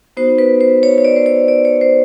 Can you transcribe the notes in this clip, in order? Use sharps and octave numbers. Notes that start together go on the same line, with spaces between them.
B3 D#4 F#4 C5
B4
C5
C#5
C#5
D5
C5
C#5
D5
C#5
C5